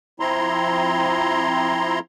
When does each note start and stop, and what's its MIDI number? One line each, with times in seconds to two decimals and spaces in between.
0.20 1.99 53
0.20 1.99 60
0.20 1.99 64
0.20 1.99 82
0.20 1.99 84